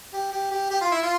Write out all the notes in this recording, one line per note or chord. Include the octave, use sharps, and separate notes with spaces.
G4
G4
G4
G4
F4
E4
F4